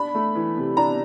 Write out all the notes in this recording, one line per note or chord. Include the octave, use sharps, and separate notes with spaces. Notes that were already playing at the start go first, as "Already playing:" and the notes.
Already playing: D4 B5
A3
E3
C3
D4 A#5